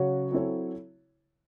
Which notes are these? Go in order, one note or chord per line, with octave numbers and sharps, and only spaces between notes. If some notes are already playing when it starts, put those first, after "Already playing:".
Already playing: C#3 F#3 C#4 F#4 C#5
F#3 C4 E4 A4 C#5